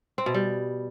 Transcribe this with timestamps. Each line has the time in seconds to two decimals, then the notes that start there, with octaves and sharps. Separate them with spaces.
0.18 C4
0.26 B2
0.34 G3